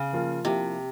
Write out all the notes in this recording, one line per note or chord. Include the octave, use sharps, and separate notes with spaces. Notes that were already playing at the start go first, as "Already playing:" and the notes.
Already playing: C#3
F3 A#3 F4
C3 F3 A#3 E4 G4